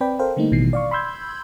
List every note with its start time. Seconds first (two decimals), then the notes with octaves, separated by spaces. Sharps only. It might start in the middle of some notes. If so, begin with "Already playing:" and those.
0.01 C4 B4 D5 G5 B5
0.19 A4 A#4 C5 F5 G5
0.37 D3 G3 A3 A#3 D#4
0.52 A1 B2 D#3 E3 G3 C7
0.73 D5 F5 C#6
0.91 B5 C6 E6 G6 G#6